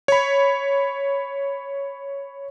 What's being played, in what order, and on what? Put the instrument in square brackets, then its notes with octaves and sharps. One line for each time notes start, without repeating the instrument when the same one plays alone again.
[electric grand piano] C#5 B5